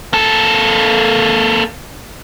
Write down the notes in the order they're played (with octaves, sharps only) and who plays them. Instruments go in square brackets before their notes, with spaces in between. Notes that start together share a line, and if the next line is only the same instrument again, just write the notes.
[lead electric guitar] A#3 A4